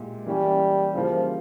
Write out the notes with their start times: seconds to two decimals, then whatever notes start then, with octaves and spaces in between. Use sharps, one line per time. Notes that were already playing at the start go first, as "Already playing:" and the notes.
Already playing: A#2 G#3 E4 G4
0.26 E3 G3 A#3 C#4 E4
0.94 C#3 E3 F3 G3 A#3